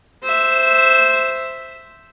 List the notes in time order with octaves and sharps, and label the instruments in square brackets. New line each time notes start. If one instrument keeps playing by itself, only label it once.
[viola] C5 E5